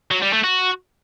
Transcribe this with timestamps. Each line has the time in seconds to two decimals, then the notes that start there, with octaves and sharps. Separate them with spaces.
0.11 F#3
0.22 G3
0.33 A3
0.44 F#4